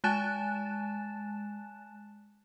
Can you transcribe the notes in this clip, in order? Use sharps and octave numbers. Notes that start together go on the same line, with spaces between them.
G#3 G#5 A5 F#6 A6 E7